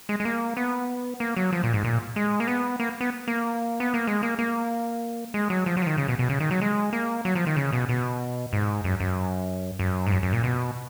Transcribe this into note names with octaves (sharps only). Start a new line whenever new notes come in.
G#3
G#3
A#3
B3
A#3
F#3
F3
A#2
G#2
A#2
G#3
A#3
B3
A#3
B3
A#3
B3
A#3
G#3
A#3
A#3
G#3
F#3
F3
F#3
F3
D#3
C#3
B2
B2
C#3
D#3
F#3
G#3
A#3
F#3
F3
D#3
C#3
B2
B2
G#2
F#2
F#2
F#2
G#2
F#2
F#2
A#2
B2